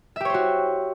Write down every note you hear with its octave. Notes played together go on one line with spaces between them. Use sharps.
F#4 G4 C5 C#5 E5